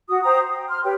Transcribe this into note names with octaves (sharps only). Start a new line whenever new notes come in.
F#4 D#6
C5 G5 A#5 D#6
G5
C6 F6
G4 B4 C#5 G5